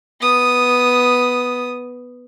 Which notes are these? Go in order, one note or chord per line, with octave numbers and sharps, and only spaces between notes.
B3 D#6